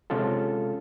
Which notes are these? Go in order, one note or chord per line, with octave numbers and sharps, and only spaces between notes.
C3 G#3 C#4 F4 A4